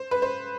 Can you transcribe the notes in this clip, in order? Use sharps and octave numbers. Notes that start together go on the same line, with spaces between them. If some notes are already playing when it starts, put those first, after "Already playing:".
Already playing: C5
B4
C5